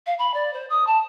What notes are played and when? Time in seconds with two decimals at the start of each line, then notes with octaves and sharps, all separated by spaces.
0.07 F5
0.19 B5
0.34 D5
0.54 C5
0.70 D#6
0.87 A5